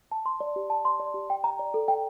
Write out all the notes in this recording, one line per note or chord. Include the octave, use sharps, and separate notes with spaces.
A5
C6
D5
G4
A5
C6
D5
G4
G5
A#5
D5
A4
G5